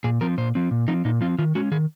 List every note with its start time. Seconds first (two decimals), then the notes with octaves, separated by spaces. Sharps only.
0.04 A#2 G#4
0.21 F3 C4 A#4
0.37 A#2 C5
0.55 F3 C4
0.71 A#2
0.88 F3 C4 D#4
1.05 A#2 D#4
1.21 F3 C4 F4
1.38 D#3 F4
1.55 G#3 C#4 F#4
1.71 D#3 G#4